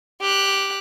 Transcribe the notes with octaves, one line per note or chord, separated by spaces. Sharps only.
G4 F#6